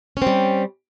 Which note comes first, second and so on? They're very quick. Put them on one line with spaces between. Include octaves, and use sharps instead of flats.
C#4 C4 G3